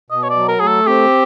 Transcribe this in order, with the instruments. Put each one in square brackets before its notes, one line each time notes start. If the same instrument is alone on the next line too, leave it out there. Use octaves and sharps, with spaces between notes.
[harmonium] B2 [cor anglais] D#5
[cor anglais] C#5
D5
[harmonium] F#3
[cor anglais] A#4
[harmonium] A3 [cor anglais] G#4
[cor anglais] A4
[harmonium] C4 [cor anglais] G4